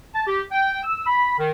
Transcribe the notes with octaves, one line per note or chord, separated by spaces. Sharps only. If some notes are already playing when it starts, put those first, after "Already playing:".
A5
G4
G5
E6
B5
D#3